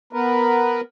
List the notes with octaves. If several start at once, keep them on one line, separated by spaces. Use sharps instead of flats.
B3 A#4 B4